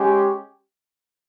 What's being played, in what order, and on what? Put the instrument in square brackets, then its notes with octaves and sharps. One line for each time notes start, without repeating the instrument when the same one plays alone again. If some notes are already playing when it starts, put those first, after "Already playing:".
Already playing: [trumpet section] G#3 C#4 G4